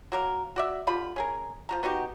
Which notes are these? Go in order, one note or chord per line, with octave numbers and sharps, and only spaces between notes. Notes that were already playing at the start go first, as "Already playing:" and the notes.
F#3 A#3 A#4
F#4 D5 E5
D3 G3 F4 B5
C#4 G#4 A#4
F3 F#4 A#5
B3 D#4 F#4 G4